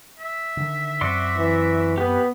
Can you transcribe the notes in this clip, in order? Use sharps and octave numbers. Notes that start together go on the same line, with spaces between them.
E5
D3 D#3
F#2 C4 F#4 D5 C6
E3
B3 G4 B4